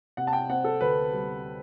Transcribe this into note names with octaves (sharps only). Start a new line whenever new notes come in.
C3 F#5
A5
G5
C4 F#5
A4
D2 B4
G3